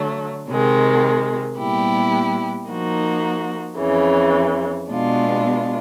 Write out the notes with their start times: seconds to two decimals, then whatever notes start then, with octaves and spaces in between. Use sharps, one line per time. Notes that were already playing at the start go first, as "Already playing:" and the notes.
Already playing: D3 F#3 A3
0.48 C3 D#3 G#3
1.58 A#2 G3 B3 E4 G4
2.69 F3 A#3 D#4 F#4
3.79 F2 C#3 E3
4.89 B2 G#3 B3 D4 F4